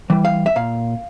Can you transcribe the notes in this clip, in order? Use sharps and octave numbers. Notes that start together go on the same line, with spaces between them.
E3 G3
F5
E5
A#2 F5